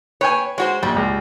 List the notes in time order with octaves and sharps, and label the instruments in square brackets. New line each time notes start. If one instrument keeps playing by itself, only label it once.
[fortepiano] B4 G5 G#5 [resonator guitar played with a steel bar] C#5
[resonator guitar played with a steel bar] G#3 F#4 C5 [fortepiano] C#5
[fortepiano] A#1 [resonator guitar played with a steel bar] G3
[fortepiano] C#2